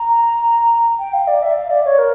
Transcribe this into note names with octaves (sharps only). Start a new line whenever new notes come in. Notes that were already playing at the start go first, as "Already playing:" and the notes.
Already playing: A#5
G5
F5
D5
E5
F5
D5
C#5
A#4